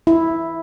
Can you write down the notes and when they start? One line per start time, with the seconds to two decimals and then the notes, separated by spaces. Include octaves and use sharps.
0.07 E4